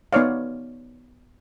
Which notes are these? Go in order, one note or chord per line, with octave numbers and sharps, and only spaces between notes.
B3 D#4 C#5 D5 F5